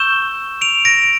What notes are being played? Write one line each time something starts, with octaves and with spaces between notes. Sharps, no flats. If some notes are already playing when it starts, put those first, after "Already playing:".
Already playing: C#6 E6 G6 E7 G7
D7 F7
A#6 D7